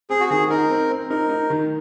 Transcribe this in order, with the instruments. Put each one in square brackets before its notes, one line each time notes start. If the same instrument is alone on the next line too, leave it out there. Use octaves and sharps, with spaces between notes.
[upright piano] C4 [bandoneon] G#4
[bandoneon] F#4
[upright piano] D#3 [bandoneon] G#4
[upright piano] D#4 [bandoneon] A#4
[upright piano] C4
C4
[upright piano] D#4 [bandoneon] A#4
[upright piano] D#4
D#3